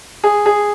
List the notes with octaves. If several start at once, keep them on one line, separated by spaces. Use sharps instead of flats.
G#4
G#4